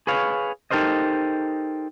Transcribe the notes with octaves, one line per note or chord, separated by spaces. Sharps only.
G#4 B4 C#5 F5
D#4 G4 A4 A#4 C5 D#5